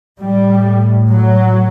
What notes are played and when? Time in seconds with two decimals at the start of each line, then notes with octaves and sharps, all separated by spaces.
0.20 A2 G3
1.08 F#3